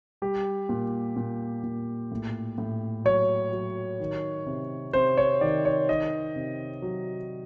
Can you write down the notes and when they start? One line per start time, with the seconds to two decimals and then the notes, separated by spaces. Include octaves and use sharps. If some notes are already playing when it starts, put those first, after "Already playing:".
0.22 G3 G4
0.69 A#2
1.16 A#2
1.63 A#2
2.12 A2
2.58 A2
3.05 F#3 C#5
3.52 F#3
4.00 D#3
4.46 C3
4.93 C3 C5
5.17 C#5
5.41 D#3 D5
5.65 C#5
5.89 D#3 D#5
6.36 C3
6.82 F#3